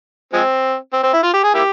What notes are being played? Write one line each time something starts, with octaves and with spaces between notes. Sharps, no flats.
F3 G#3 C4
C4
C4
E4
F4
G4
G#4
A#3 E4 G4